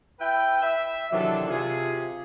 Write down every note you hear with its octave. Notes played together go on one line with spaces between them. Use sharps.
E4 B4 E5 G5
E5
C3 D#3 E3 F#3 D4 A4
C3 F4 G#4